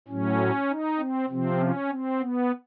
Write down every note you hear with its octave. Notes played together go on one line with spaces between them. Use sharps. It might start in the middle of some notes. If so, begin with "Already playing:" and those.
A2 F#3 C#4
D#4
C4
C3 F3 C4
C#4
C4
B3